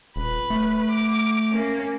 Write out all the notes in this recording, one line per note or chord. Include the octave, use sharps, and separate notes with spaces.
D#1 B4
A3
D6
A#3 C#4